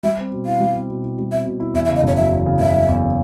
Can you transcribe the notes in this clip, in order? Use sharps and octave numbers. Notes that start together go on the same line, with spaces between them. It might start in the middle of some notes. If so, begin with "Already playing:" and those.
G3 E5
C4
B2
E4 F5
G3
C4
B2
E4
G3
C4 E5
B2
E4
E2 E5
E5
C#3
D#5
F#1 C#5
F#3 E5
E2
C#3
F#1 E5
F#3
E2
C#3